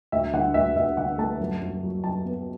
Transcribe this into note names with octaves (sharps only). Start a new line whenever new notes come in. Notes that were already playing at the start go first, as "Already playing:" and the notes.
D2 E5
D3 F#5
D2 E5
D2 E5
D3 F#5
A3 A5
F#2
F#2
F#3
F#2 A5
B3